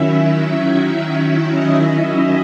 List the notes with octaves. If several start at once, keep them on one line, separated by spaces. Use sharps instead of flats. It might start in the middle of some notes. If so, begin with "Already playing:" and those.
Already playing: D#3 F#3 C#4 E4 E5
E5
D#5